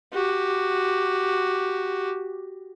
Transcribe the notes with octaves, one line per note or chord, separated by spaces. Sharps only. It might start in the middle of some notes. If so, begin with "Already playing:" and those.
F#4 G4